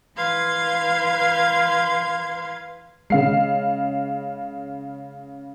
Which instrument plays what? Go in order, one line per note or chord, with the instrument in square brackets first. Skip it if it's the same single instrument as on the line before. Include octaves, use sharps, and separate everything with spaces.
[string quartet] E3 B4 F5 C6 G#6
[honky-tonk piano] C#3 F5 C7 [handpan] G#3